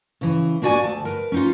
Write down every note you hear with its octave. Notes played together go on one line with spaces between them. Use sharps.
C#3 E3
A#3 D4 F#4 D5 G#5
D2 A5
A#4 B4
C#4 D#4 F4